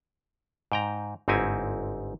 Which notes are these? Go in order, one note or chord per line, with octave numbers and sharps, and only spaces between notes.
G#2 G5 A#5
G1 G#2 C4 D#4 E4 G#5